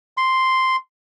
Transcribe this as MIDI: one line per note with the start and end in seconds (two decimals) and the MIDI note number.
0.17 0.76 84